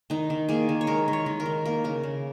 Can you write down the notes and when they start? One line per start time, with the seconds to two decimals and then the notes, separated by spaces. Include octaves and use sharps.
0.10 D#3 D#4
0.30 D#3
0.49 A#3 G#4
0.69 D#3
0.81 C#5
0.87 G#3 A#4
1.08 D#3
1.13 C#5
1.26 D#3
1.40 A#4
1.46 D#3
1.65 A#3 A#4
1.84 C#3 A#4
2.03 C#3